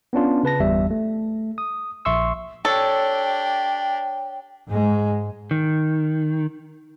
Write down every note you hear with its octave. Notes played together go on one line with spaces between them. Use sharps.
B3 C#4 D4 F4
C#3 B4 A5 A#6
G1 E2 G3 E5
A3
D#6
A#1 E5 C6 C#6 E6
D4 G4 A4 C#5 G5
G#2 G#3
D#3